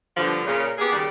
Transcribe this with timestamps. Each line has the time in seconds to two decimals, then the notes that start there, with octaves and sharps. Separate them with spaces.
0.16 G2 B2 D3 F3
0.45 A#2 C#3
0.78 A#3 B3 G4 G#4
0.91 D#2 C#3 G3 D5